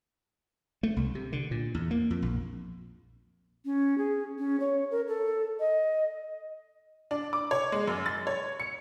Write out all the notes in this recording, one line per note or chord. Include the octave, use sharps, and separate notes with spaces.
A3
C2
C3
D3
A#2
E2
A#3
F2
A#1
C#4
G#4
C#4
C#5
A#4
A4
D#5
D4
D6
C#5
G#3
F#2
A6
C#5
C#7